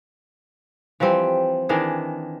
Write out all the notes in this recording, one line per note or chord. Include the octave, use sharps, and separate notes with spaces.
E3 F3 G3 C4
D#3 E3 D4 G#4